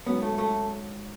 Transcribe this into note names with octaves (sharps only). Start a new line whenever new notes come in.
G#2 F#3 B3 C#4
A3
A3